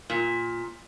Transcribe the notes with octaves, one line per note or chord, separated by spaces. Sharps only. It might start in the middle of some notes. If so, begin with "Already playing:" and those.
A#2